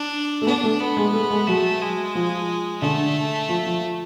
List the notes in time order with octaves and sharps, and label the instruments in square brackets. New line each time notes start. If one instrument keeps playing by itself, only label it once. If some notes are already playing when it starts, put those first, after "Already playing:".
Already playing: [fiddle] D4
[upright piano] A3
[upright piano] B3 [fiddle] D4
[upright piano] A3
[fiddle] B3
[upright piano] G#3
A3
G#3
[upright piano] F#3 [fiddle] A3
[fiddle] G#3
[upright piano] F3
[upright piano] D3 [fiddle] A3
[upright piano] F3
F3